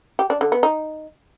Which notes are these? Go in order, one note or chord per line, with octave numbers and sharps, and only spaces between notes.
G4
D4
D3
B3
D#4